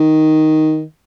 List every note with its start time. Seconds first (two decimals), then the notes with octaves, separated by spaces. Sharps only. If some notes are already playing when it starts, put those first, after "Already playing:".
Already playing: D#3